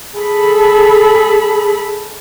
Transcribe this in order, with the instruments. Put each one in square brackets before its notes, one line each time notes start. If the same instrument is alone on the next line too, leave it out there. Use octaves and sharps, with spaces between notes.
[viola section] G#4 A4 B5